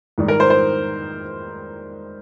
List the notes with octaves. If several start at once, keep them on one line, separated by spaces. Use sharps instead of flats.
G#2 D#3 G3
A#4
C5
C5